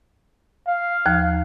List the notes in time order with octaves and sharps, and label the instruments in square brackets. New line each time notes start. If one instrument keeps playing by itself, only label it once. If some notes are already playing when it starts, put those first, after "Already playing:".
[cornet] F5
[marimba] D#2 F3